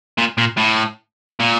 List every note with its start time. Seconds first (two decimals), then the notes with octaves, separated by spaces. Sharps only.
0.18 A#2
0.38 A#2
0.57 A2
1.40 A#2